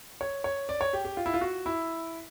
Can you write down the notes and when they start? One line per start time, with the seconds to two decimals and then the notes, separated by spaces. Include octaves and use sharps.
0.21 C#5
0.44 C#5
0.69 D5
0.81 C#5
0.93 G4
1.05 G4
1.17 F4
1.26 E4
1.34 F4
1.41 F#4
1.66 E4